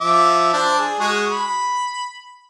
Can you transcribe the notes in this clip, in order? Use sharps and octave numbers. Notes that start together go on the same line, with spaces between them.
F3 E5 D6
D4 C5
G#4
G#3 F#4 G#4
B5